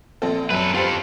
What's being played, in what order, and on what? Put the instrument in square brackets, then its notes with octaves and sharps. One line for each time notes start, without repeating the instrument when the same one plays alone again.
[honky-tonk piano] A#1 C4 A4
[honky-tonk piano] F#2 [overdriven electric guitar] A4 B4
[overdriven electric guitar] F4 A4 [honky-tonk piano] G4 C5